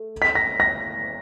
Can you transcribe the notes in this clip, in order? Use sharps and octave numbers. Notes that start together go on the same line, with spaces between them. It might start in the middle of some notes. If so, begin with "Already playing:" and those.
Already playing: A3
B6
A#6
A#6